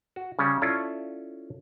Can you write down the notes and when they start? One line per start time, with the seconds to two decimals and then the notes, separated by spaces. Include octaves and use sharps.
0.16 F#4
0.39 C#3 G3 C#4
0.62 C#4 E4 F4 A4 D5